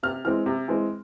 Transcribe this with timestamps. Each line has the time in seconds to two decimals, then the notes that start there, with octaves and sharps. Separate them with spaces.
0.03 C3 F6
0.24 E3 G#3 C4 F6
0.46 C3
0.68 E3 G#3 C4